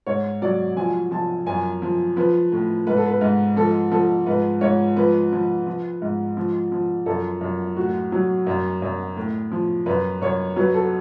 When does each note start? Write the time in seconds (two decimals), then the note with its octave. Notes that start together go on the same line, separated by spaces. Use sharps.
0.07 G#2 C#5
0.42 F#3 D5
0.77 F3 G#5
1.11 F3 A5
1.46 F#2 G#5
1.82 F3
2.16 F3 B4
2.52 A2
2.87 G#2 B4
2.97 A4
3.07 B4
3.21 G#2
3.56 F3 A4
3.92 F3 A4
4.27 G#2 B4
4.61 G#2 C#5
4.97 F3 B4
5.32 F3
5.67 F3
6.02 G#2
6.37 F3
6.72 F3
7.06 F#2 A4
7.41 F#2
7.76 A2 F#4
8.12 F#3
8.47 F#2
8.82 F#2
9.17 A2
9.52 F3
9.86 F#2 B4
10.22 F#2 C#5
10.56 F#3 B4
10.74 A4